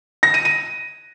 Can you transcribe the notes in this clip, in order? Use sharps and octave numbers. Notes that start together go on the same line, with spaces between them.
A#6
D#7
D#7